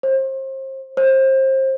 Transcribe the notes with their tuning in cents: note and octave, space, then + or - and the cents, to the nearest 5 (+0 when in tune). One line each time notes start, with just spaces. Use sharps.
C5 +35
C5 +30